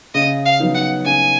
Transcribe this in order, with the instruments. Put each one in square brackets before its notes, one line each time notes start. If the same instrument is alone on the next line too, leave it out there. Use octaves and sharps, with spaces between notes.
[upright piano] C#3 [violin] D#5
[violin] F5
[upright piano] F#3 B3 D#4
[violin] F#5
[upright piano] C#3 [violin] G#5